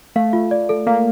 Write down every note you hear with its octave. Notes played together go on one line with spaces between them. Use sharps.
A3 F5
F4
D5
A4
A#3 F5